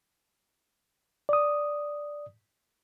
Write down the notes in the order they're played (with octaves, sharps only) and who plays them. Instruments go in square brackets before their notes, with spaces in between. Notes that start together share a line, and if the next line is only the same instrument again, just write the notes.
[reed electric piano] D5 D#6